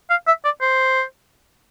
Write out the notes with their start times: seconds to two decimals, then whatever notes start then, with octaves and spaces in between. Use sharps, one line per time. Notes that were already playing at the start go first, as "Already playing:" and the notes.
0.10 F5
0.27 E5
0.45 D5
0.61 C5